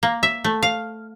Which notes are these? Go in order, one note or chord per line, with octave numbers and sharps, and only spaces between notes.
A#3
E5
A3
F5